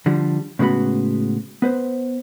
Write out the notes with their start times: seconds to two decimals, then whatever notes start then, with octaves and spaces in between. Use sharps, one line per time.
0.06 D3 F3 G3
0.59 A2 C#3 G#3 B3 F#4 B5
1.62 B3 B4 C5